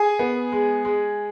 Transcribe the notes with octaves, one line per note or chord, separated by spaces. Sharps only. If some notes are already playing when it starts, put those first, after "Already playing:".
Already playing: G#4 G#5
B3
G#3
G#3